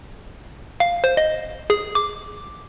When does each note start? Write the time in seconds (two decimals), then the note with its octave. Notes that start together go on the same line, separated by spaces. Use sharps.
0.80 F5
1.04 C5
1.17 D#5
1.70 G#4
1.95 D6